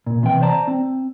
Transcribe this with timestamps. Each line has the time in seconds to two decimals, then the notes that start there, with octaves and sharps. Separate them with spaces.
0.07 A#2
0.23 C3 E3 G5
0.42 C5 D5 A5 A#5
0.68 C4